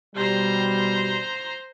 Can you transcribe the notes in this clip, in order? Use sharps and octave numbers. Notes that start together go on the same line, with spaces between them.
B2 G3 C5 A#5